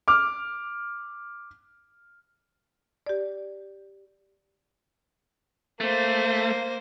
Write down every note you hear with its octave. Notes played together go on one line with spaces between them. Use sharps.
D6 F6
G4 D5
A3 A#3 C5